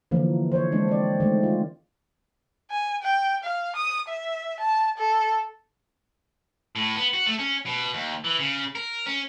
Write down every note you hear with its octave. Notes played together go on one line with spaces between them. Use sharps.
D3 E3 F3 A#3
C5 C#5
G#3 C4 D4
C4 D5
D#3 G#3 A3
F4
G#5
G5
F5
D#6
E5
A5
A4
A2
B3
F#4
A3
C#4
B2
D#2
E3
C#3
A#4
C#4